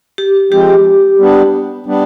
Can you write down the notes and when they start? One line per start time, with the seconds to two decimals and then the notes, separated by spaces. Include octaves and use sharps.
0.18 G4
0.51 F3 G#3 C4 G4
1.19 G3 B3 D4
1.86 G3 B3 D4